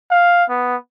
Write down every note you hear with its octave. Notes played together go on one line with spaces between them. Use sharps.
F5
B3